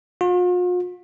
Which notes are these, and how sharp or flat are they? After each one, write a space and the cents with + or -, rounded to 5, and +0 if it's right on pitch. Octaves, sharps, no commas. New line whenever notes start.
F4 +45